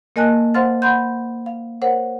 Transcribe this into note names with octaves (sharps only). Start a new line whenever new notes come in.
A#3 A#4 D#5 G#5 A5 F#6
C5 F5 F#5 C6 F6 A6
F#5 B5 C6 G6
F5
A#4 C5 C#5 F#5